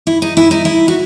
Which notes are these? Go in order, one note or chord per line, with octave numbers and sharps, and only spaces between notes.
E4
D#4
E4
D#4
E4
F#4